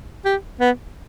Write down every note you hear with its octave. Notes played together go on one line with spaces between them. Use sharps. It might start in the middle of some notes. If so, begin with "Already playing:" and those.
G4
B3